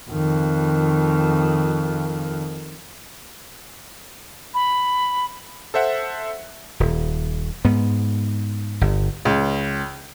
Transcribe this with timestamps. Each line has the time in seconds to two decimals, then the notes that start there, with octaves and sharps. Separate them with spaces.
0.10 F2 D#3
4.54 B5
5.74 A4 C5 E5 F#5
6.80 D#1
7.65 G#2 B3
8.81 G1
9.25 C#2